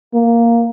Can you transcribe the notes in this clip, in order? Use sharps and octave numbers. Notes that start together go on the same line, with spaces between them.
A#3